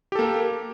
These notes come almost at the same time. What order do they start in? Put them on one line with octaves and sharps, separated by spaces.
G4 A4 A#3